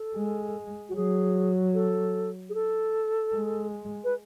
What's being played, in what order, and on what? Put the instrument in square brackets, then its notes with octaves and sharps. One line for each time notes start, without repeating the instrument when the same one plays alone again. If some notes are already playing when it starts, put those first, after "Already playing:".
Already playing: [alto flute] A4
[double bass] G#3
[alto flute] F#4
[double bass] F#3 [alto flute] G#4
[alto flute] A4
G#4
A4
[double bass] G#3
[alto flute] B4